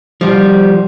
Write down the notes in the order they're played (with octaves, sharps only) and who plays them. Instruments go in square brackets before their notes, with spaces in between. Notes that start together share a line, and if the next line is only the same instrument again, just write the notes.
[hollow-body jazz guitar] F3 G3